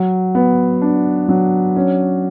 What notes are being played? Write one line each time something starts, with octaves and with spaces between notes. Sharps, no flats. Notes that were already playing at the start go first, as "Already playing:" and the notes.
Already playing: F#3
B3
D4
F#3
C#4